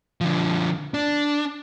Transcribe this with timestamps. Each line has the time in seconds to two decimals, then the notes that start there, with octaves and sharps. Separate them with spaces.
0.21 D3 F3
0.94 D4